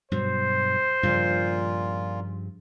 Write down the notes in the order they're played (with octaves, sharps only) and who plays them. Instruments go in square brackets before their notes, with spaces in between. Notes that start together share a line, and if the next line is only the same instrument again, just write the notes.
[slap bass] G2 B2 F#3 [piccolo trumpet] C5
[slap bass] G2 C#3 F3 [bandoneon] A#2 F4